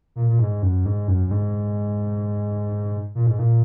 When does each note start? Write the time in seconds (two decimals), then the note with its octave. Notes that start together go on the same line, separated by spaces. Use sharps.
0.16 A#2
0.29 A#2
0.39 G#2
0.62 F#2
0.85 G#2
1.08 F#2
1.27 F#2
1.31 G#2
3.15 A#2
3.26 G#2
3.39 A#2